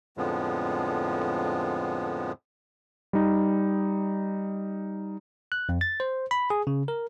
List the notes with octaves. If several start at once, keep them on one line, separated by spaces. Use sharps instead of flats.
F2 A2 D3 F3 G#3 B3
G3 D#4
F#6
F2
A6
C5
B5
G#4
C#3
A#4